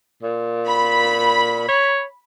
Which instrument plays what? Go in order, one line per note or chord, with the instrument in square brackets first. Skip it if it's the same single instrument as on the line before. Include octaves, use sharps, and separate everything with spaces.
[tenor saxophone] A#2
[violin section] B5
[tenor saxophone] C#5